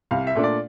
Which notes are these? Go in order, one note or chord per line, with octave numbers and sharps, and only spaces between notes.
C2 F5
E5
A#2 A3 D4
D5